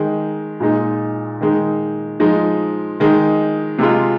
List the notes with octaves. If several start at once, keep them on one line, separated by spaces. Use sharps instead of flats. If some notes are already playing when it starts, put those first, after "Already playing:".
Already playing: D#3 G#3 D#4
A#2 G#3 D#4
D#3 G#3 D#4
F3 G#3 D#4
D#3 G#3 D#4
C3 G#3 F4